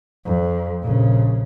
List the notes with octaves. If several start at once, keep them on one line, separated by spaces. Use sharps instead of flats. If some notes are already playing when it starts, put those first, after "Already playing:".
F2
A#1 C#3